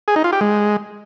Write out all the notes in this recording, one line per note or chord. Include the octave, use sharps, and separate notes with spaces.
G#4
D#4
F4
G4
G#3